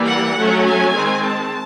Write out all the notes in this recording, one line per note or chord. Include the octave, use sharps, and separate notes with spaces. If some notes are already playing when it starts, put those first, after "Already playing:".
Already playing: E3 G3 A#3
F#5
F#3 A3 C#4
G#5
D#3 G#3 C4
A5